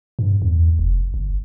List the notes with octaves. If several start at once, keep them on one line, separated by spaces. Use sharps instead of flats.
G2
E2
F1
G1